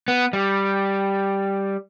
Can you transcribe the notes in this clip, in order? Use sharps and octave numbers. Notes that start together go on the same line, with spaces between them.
B3
G3